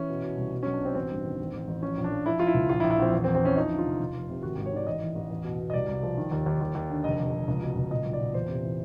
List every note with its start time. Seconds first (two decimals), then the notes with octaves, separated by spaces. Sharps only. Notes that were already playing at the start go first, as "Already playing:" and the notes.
Already playing: E3 C#4
0.09 B2
0.23 B2
0.37 C2
0.53 B2
0.63 B1 C#4
0.73 D4
0.81 B2 C4
0.95 A1 C4
1.10 G2
1.25 D#3
1.39 A1
1.53 A1
1.67 A1
1.82 F3 C#4
1.98 A#1
2.04 D4
2.11 F3
2.26 F3 E4
2.39 F3 F4
2.47 E4
2.54 C#2
2.69 A#1 F4
2.80 E4
2.84 A#1
2.91 E4
2.99 A#1 C4
3.13 E2
3.24 C4
3.28 E2
3.35 C4
3.42 E3 C#4
3.56 F3 D#4
3.71 D3
3.78 F4
3.85 F1
3.99 F1
4.14 F1
4.29 C3
4.43 G#1 F#4
4.54 G#2 G4
4.66 C#5
4.73 D#3 D5
4.87 A1 D#5
5.01 E3
5.15 A1
5.30 E2
5.44 B2
5.60 B2
5.70 D#5
5.73 C2 D5
5.88 C2
6.03 F3
6.18 D#3
6.31 D#2
6.46 D#2
6.61 D#2
6.75 D#2
6.90 D3
7.04 F1 D#5
7.19 F1
7.33 F1
7.48 C#2
7.62 B2
7.76 C#2
7.91 A#2 D#5
8.06 B1
8.13 D5
8.20 A#2
8.34 E2 C5
8.49 C3
8.63 E3